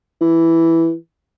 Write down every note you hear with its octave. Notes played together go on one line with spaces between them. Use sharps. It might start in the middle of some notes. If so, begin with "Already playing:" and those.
E3